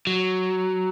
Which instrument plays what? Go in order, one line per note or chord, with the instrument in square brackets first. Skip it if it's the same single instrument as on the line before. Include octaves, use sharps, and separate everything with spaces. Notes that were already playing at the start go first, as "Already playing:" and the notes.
[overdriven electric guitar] F#3